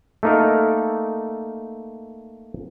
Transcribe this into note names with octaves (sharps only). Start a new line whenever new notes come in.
A3 A#3 D#4 A4 A#4